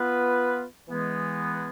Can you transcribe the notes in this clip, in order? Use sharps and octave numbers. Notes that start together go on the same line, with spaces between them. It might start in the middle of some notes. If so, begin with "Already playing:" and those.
Already playing: B3 F4 B4
E3 G#3 B3